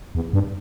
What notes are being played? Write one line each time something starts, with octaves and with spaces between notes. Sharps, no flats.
E2
G2